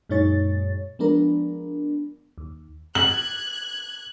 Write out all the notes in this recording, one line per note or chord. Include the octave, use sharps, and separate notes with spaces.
F#2 A#2 G#3 D#4 C#5 A6
F3 G#3 B3 D4 A#4
D#2
F#6 G#6 F#7